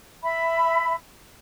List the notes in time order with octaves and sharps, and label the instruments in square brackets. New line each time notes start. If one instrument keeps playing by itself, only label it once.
[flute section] E5 B5